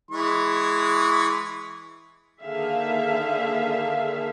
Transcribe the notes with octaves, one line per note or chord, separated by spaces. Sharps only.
E3 G#3 C#6
D3 D#3 A#3 G#4 E5 F5